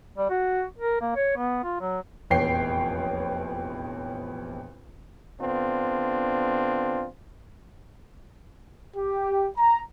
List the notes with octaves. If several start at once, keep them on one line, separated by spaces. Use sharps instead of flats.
G3
F#4
A#4
A#3
C#5
B3
F4
F#3
F1 A#1 E2 C#5 G5 C7
D3 B3 C4 D4 F4
G4
A#5